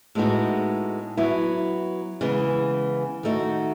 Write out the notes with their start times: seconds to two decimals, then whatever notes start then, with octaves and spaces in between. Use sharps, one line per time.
0.15 A2 G#3 B3 D#4 F#4
1.17 F#3 B3 E4
2.21 C#3 E3 G#3 B3
3.23 D#3 A3 D#4 F#4